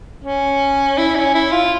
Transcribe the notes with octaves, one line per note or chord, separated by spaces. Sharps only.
C#4
E4
C#4
E4
F4